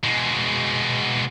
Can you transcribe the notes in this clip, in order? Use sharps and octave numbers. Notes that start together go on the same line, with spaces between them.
B2 G#3